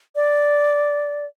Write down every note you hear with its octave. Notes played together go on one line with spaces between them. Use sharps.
D5